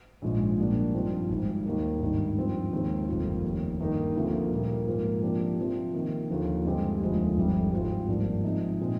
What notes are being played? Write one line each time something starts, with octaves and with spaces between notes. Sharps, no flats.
A#1 G#2 F3 G#3
A#1 A#2 G3 A#3 D4
G2 F3 C4 D#4
G#1 G#2 G3
D#2 D#3 G3 A#3
G#1 G2 D#3
G2 F3 C4
D#2 D#3 G#3 C4
G1 F2 D#3 A#3 F4
F1 D#2 D#3
G2 D#3 A#3 D#4 A#4
D2 C3 F3 A#3
A#2 G3 A#3
G#2 F3 A#3 F4
C3 F3 A#3 D4 G4
C3 F3 C4
C3 D#3 A#3
D#2 D3 F3
G2 D3 G#3 C4 G4
F1 D#2 D3 F3 G#3
G1 F2 C3 G3
G#1 G#2 G3 C4 F4
G#1 G2 F3 A#3 D4
C3 F3 G#3 D#4
A#2 G#3 C4 D#4